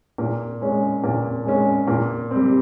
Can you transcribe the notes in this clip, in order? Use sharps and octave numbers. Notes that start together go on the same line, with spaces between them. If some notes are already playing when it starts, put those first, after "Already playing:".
A#2
G#3 C#4
A#2
G#3 C#4
A#2
G3 C4